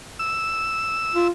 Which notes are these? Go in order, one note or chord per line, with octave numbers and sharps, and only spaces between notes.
E6
F4